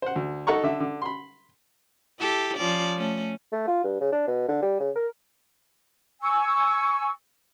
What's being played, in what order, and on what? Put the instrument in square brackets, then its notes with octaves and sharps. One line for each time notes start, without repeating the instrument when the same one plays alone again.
[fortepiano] C5 F#5
D2
D#4 A4 F#5 A#5 C#6
D3 E5
D3
B5 C6
[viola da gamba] E4 G4 A4
F3 C#4 D5
A3 C#4
[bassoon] A3
F4
G2
C#3
D4
B2
D3
G3
C#3
A#4
[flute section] G#5 C#6 E6